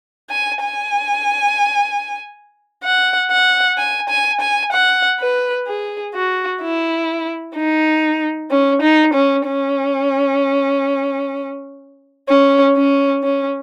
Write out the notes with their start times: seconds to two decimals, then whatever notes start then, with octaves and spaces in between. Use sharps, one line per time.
0.30 G#5
0.62 G#5
2.84 F#5
3.31 F#5
3.78 G#5
4.09 G#5
4.41 G#5
4.72 F#5
5.20 B4
5.67 G#4
6.14 F#4
6.62 E4
7.56 D#4
8.51 C#4
8.82 D#4
9.14 C#4
9.46 C#4
12.29 C#4
12.77 C#4
13.24 C#4